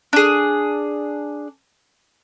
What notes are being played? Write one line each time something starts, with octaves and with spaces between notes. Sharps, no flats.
D4 G#4